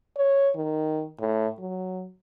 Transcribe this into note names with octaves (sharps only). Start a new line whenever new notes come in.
C#5
D#3
A2
F#3